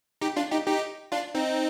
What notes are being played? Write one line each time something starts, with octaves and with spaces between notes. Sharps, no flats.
D#4 G4
D4 F4
D#4 G4
D#4 G4
D4 F4
C4 D#4